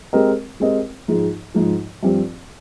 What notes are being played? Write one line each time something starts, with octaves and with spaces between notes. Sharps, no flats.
G#3 C4 G4 A#4 D#5
G#3 C4 G4 A#4 D#5
G#2 F3 G#3
G#2 F3 G#3
G2 F3 C4 G4